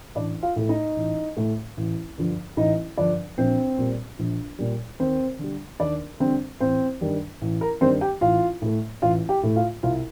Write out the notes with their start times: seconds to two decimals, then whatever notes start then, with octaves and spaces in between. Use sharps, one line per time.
0.15 A1 D4 D5
0.43 F4 F5
0.56 A2 A3
0.69 D#4 D#5
0.96 A1
1.37 A2 A3
1.77 A1
2.18 G2 D3 F3
2.57 A1 D#4 D#5
2.97 G2 D3 F3 D4 D5
3.38 A#1 C4 C5
3.78 A#2 G3
4.19 A#1
4.59 A#2 G3
5.00 D#2 C4 C5
5.39 D3 G3
5.80 D#2 D4 D5
6.20 D3 G3 C4 C5
6.60 A1 C4 C5
7.01 G2 D#3 G3
7.41 A1
7.61 A#4
7.81 G2 D#3 G3 C4 C5
8.01 G4 G5
8.21 A1 F4 F5
8.62 A2 A3
9.02 A1 F4 F5
9.29 G4 G5
9.43 A2 A3
9.56 F4 F5
9.83 C2 F4 F5